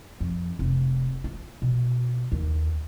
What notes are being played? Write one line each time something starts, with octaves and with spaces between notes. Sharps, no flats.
F2
F1
F4
B2
D#2